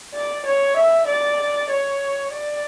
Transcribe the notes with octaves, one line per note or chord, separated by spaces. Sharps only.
D5
C#5
E5
D5
C#5
D5